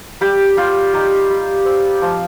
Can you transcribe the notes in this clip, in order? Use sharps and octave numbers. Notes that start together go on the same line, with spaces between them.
G3 G4
G3 F4
D#4 G4
G3
C4
F3